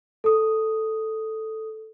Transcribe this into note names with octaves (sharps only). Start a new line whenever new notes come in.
A4 D#6